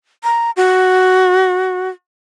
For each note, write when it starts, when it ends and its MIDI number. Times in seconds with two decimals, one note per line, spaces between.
0.24 0.51 82
0.57 1.89 66